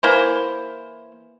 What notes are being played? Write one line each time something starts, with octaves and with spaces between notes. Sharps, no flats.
E3 A#3 E4 C5